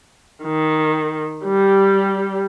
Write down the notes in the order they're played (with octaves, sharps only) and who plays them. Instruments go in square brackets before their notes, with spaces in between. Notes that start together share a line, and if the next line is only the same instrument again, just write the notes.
[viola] D#3
G3 G4